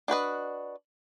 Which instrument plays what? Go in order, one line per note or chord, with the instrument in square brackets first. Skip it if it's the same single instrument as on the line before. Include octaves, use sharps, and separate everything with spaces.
[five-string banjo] D4 F#4 B4 D#5